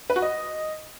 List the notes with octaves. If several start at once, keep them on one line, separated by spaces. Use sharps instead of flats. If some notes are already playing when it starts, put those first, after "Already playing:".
B4
F#4
D#5